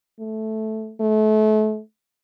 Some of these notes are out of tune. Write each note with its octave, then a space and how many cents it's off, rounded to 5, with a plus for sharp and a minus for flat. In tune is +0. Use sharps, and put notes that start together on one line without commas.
A3 -5
A3 -35